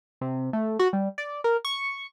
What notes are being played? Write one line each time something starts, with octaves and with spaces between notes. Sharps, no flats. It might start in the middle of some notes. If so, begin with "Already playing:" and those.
C3
A3
F#4
G3
D5
A#4
C#6